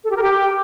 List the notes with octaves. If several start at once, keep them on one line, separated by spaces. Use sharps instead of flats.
A4
G4
A#4
G4